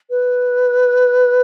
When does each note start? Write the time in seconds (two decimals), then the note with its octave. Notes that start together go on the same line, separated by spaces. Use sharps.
0.10 B4